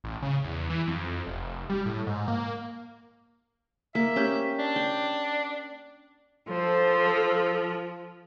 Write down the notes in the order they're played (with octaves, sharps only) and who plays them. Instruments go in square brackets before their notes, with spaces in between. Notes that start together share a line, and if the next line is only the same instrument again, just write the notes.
[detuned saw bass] A1
C#3
E2
E3
F2
F1
G3
A2
G#2
A#3
[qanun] A#3 [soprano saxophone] E5
[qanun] C#4 G4 G5
[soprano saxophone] D4
[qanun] G5
[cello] F3 [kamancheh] A4 C5